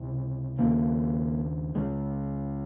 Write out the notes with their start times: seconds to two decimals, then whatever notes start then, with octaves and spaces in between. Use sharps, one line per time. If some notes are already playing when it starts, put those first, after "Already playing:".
Already playing: C#2 C3
0.58 D#2 C#3 A#3
1.75 C#2 C#3 G#3